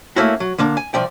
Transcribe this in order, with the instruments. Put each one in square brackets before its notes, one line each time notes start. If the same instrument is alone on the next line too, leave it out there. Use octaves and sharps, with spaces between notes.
[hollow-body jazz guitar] A3 A#3 C#4 E4 F#4
F#3
D3 A#3 D4
G#5
C2 F3 D5 G5